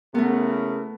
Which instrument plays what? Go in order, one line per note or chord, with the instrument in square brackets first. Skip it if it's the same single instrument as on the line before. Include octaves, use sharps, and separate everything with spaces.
[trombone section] C#3 E4 A#4 [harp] A3 B3